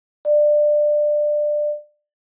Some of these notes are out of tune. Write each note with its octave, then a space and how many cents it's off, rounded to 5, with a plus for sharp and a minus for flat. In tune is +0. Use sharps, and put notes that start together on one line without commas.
D5 +20